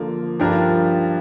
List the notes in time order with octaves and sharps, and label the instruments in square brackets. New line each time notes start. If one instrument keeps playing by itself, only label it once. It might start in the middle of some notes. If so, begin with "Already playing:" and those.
Already playing: [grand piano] D3 F3 A#3
G2 F3 D4 G4 A#4